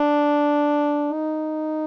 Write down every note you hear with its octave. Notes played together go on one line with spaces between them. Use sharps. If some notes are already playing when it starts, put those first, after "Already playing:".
Already playing: D4
D#4